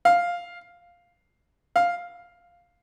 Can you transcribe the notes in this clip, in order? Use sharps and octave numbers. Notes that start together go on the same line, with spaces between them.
F5
F5